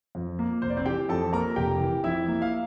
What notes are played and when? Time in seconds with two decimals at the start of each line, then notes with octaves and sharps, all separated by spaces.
0.15 F2
0.39 A#3
0.62 F1 C5
0.70 D5
0.77 C4 C5
0.86 E3 G4 G5
1.09 F2 A4 A5
1.33 A#3 A#4 A#5
1.56 F1 G4 G5
1.80 E3
2.04 F2 E4 E5
2.28 A#3
2.42 F5